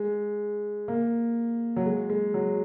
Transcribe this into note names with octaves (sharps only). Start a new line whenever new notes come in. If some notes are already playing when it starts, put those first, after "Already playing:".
Already playing: G#3
A#3
F#3
G#3
G#3
F#3